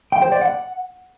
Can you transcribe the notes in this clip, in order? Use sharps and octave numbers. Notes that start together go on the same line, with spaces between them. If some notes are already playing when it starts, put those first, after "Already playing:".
G5
C5
D5
F#5